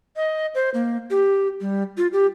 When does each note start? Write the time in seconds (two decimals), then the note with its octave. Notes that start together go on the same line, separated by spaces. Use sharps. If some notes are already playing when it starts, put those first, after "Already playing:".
0.16 D#5
0.55 C5
0.74 A#3
1.10 G4
1.61 G3
1.97 F4
2.13 G4